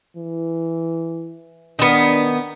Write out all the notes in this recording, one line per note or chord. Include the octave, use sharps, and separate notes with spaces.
E3
D#3 B3 D4